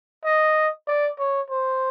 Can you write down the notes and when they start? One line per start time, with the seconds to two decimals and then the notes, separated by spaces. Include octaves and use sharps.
0.24 D#5
0.87 D5
1.19 C#5
1.50 C5